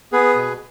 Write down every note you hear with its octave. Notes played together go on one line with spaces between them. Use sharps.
B3 G#4 B4
B2